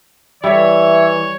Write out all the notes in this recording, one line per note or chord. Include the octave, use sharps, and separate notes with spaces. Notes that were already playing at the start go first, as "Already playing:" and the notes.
E3 G3 C#5 E5